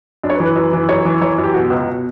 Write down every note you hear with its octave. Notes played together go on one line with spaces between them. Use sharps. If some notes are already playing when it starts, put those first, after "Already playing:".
F#2 D4
C#5
B4
E3
B4
F#2
E3
F#2 C#5
E3
E3 C#5
F#2
G4
B2 F#4
C#2 B4
B2